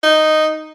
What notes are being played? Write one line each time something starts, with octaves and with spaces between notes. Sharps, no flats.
D#4